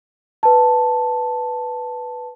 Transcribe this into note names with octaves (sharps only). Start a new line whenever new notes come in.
B4 A5